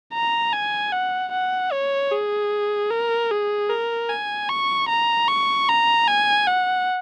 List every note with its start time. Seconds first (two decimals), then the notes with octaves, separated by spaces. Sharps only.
0.14 A#5
0.53 G#5
0.92 F#5
1.32 F#5
1.72 C#5
2.11 G#4
2.91 A#4
3.31 G#4
3.70 A#4
4.10 G#5
4.49 C#6
4.89 A#5
5.28 C#6
5.69 A#5
6.08 G#5
6.47 F#5